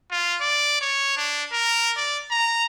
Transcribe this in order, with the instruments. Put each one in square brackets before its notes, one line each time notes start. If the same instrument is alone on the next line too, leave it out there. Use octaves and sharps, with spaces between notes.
[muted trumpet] F4
D5
C#5
D4
A#4
D5
A#5